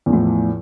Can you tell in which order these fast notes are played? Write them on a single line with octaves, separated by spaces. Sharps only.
E2 F3 A2